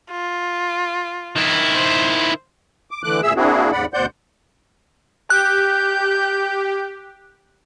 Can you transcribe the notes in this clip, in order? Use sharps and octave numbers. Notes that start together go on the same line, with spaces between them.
F4
D#3 E4
C5
D6
D3 E3 A3 D6 F#6
D2 A#2 G#4 E5 E6
A#3 C4 D4 E4 F#4 G#4
D#2 G#2 C#3 D5 F#5 B5
D2 B2 C5 D5 F#5 G6
G4 F#6 G6